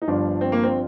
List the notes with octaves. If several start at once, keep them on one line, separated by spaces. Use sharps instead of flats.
D#4
G1 G2 F3 D4
C4
A#3
C4